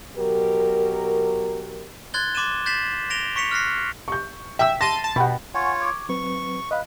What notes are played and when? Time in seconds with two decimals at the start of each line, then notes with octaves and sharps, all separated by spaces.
0.16 B2 F#3 G4 A#4
2.14 C6 F#6 G#6 A6 G7
2.35 C6 D6 A6 D#7 E7
2.66 G6 A6 B6 C7 E7 F#7
3.10 A#6 D7 F7 G7
3.36 C#6 B6 C#7 F7
3.51 F6 F#6 A#6 C7
4.08 C#6 G6
4.59 E5 G5 E6
4.81 A5 C6 A#6 D#7
5.04 A5
5.16 B2 F#5 G5 B5
5.54 F4 C#5 F#5 G#5 C#6
5.81 C#6 D6 G#6
6.09 F#3 C4 B4 C#6
6.71 B4 D#5 F5